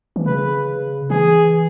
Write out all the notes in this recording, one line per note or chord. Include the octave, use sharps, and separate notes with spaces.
E3
C#3 B4
E3 G#4